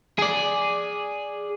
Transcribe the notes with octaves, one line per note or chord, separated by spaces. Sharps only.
G#4 D5